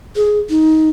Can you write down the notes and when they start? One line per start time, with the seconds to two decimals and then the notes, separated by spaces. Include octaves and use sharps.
0.16 G#4
0.50 D#4